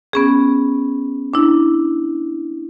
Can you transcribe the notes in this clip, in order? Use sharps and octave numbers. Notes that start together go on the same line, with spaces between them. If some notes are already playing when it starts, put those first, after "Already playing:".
B3 C#4 G#4
D4 E4